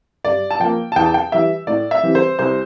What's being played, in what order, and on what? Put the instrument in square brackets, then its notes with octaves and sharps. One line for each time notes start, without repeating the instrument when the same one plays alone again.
[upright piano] G2 D5
A5
F3 A#3 G5
A5
E2 G5
A5
G5
E3 G3 E5
A2 D5
E5
E3 G3 C4
C5
C2 C5